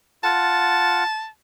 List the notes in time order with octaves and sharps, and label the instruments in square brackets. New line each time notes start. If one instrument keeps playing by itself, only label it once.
[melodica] F4 F#5 [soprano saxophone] A5